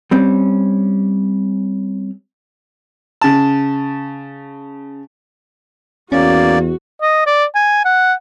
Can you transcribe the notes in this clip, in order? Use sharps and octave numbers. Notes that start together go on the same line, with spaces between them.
G3 C4 C#4
C#3 A5
E2 A#3 C#4 F#4 D5
D#5
D5
G#5
F#5